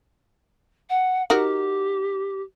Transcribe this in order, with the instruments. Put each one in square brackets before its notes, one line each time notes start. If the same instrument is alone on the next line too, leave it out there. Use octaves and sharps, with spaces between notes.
[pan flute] F#5
[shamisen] D#4 F#4 A#4 [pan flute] G4